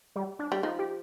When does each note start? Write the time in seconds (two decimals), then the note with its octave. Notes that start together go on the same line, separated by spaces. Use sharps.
0.16 G3
0.39 D4
0.52 G3
0.63 F3 D#4
0.79 G4